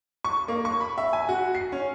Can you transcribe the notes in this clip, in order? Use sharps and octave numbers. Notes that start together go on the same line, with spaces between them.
C#6
A#3
C#6
B5
E5
G#5
F#4
C7
C#4